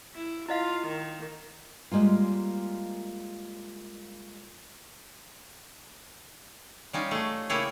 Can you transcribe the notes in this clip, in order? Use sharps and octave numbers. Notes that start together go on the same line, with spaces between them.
E4
E4 F4 D#5 F5
D#3
G3 G#3 A#3 F4
G3 C#4 D#4 F4
A3 G#4
C#3 A#3 E4 G4 G#4 C#5